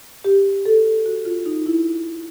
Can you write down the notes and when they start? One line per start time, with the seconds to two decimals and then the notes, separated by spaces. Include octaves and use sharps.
0.24 G4
0.65 A4
1.06 F#4
1.25 F4
1.46 D#4
1.66 E4